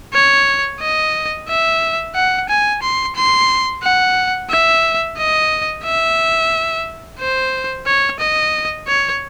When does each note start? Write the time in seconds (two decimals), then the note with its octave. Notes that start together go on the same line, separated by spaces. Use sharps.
0.14 C#5
0.81 D#5
1.48 E5
2.15 F#5
2.49 G#5
2.82 C6
3.16 C6
3.83 F#5
4.50 E5
5.18 D#5
5.84 E5
7.19 C5
7.86 C#5
8.20 D#5
8.88 C#5